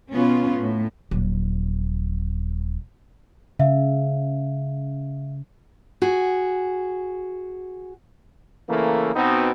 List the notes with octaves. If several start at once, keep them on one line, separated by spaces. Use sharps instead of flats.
B2 B3 C#4 F4
A2
D#1 F#3
C#3 E5 F5
F#4 G#4
C#3 E3 A3 A#3
B2 B3 C4 D#4 F#4